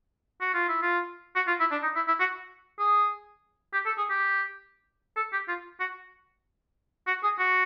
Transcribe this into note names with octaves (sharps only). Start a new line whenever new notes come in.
F#4
F4
E4
F4
F#4
F4
E4
D4
D#4
E4
E4
F#4
G#4
G4
A4
G#4
G4
A4
G4
F4
F#4
F#4
G#4
F#4